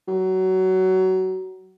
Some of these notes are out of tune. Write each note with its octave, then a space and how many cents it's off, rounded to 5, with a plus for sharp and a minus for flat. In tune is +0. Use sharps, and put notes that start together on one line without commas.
F#3 +20